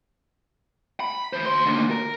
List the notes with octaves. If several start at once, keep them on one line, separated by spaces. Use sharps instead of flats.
B5
E3 C5
D2 C6
D#2 D3
A#4